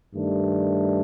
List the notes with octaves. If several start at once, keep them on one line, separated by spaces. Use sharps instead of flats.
G2 D#3 A3 D4